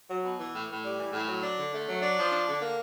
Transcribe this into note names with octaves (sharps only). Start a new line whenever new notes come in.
F#3
B2
E3
A2
A2
G3
E3
A2
F#3
D4
D3
A3
F#3
D4
F3
D4
D3
A#3